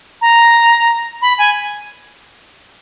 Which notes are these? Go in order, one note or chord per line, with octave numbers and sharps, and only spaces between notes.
A#5
B5
G#5